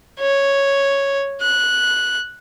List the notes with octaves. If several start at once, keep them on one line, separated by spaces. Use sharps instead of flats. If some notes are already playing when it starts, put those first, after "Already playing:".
C#5
F#6